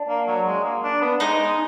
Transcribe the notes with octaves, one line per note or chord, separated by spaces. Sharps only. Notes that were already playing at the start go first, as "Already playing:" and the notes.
Already playing: D4
A#3
F#3
G#3
A#3
D4
B3
G#3 D#4 D#5
G#3